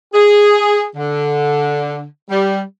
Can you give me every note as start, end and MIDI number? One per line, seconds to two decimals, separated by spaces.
0.14 0.86 68
0.96 2.03 50
2.30 2.61 55